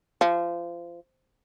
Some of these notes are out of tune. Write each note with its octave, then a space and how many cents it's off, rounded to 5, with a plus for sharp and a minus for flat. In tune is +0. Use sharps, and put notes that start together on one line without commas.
F3 -25